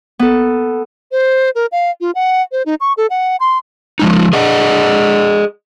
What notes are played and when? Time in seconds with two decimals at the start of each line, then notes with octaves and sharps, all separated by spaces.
0.19 B3 A4
1.12 C5
1.55 A#4
1.72 F5
2.01 F4
2.15 F#5
2.52 C5
2.66 D#4
2.80 C#6
2.97 A4
3.10 F#5
3.40 C6
3.99 F3 G#3 D#4
4.33 G#4 D5 D#5 F#5